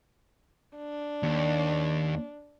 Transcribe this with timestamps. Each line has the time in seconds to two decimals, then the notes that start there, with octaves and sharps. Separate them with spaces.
0.77 D4
1.23 D#2